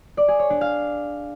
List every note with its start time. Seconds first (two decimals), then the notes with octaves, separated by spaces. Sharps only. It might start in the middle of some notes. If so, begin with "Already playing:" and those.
0.17 D5
0.28 G#4
0.39 C#5
0.50 D4
0.61 F5